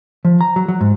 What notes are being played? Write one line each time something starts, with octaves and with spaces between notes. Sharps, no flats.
F3
A#5
F#3
F#3
G#2